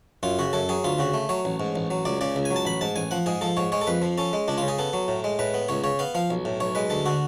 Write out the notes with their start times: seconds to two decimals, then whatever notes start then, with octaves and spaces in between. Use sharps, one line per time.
0.23 F#2 F4
0.39 C#3 F#4
0.53 F#2 A4
0.69 F#3 G#4
0.84 D2 F4
0.99 C#3 F#4
1.14 A3
1.29 F#3 C#5
1.45 A1
1.60 G#2
1.76 A1
1.91 F#3
2.05 C#2 D5
2.21 C#3 D5
2.36 C#2
2.45 G#5
2.51 F#3
2.56 A5
2.65 A1 B5
2.81 G#2 A5
2.96 A1 G#5
3.11 F3 F#5
3.26 G#2 G#4
3.41 F3 A4
3.57 G#2 C#5
3.72 G#3 C#5
3.82 A4
3.87 F2 B4
4.02 F3
4.18 C#4 A4
4.33 G#3
4.48 C#2 D4
4.58 C#3 F4
4.68 G#4
4.79 B3 A4
4.93 F#3
5.08 A2
5.24 G#3
5.39 A2 B4
5.54 B3
5.69 C#2 C#5
5.84 C#3 C#5
5.99 B3 F5
6.15 F3 F5
6.30 B1
6.45 A2
6.60 B1 C#5
6.75 G#3 B4
6.90 D2 A4
7.06 D3 F#4